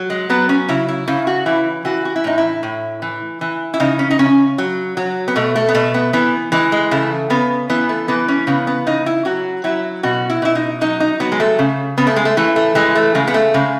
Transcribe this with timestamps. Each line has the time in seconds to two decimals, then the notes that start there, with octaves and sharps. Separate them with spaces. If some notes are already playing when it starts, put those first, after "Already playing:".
Already playing: F#3
0.10 G#3
0.30 F#3 B3
0.49 C#4
0.68 C#3 E4
0.88 E4
1.07 C#3 E4
1.27 F#4
1.46 E3 E4
1.85 E3 F#4
2.05 F#4
2.16 E4
2.24 A2 D#4
2.38 E4
2.63 A2
3.02 E3
3.41 E3
3.74 E4
3.80 C#3 D#4
3.99 C#4
4.11 D#4
4.19 C#3 C#4
4.58 F#3
4.97 F#3
5.28 B3
5.36 B2 A3
5.56 A3
5.69 B3
5.74 B2 A3
5.94 B3
6.13 E3 B3
6.52 E3 G#3
6.72 G#3
6.91 C#3 A3
7.30 C#3 B3
7.69 E3 B3
7.89 A3
8.08 E3 B3
8.28 C#4
8.47 C#3 B3
8.67 B3
8.87 C#3 D#4
9.06 E4
9.25 F#3 F#4
9.64 F#3 E4
10.03 B2 F#4
10.30 E4
10.42 B2 E4
10.55 D#4
10.81 F#3 D#4
11.00 D#4
11.20 F#3 B3
11.32 G#3
11.40 A3
11.59 C#3
11.98 C#3 B3
12.07 A3
12.16 G#3
12.25 A3
12.37 E3 A3
12.56 A3
12.75 E3 G#3
12.95 A3
13.15 C#3 G#3
13.27 B3
13.34 A3
13.54 C#3 G#3